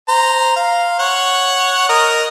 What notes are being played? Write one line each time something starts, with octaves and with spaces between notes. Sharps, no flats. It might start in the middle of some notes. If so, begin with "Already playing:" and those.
C5 A#5
F5
C#5 F#5
A#4 D#5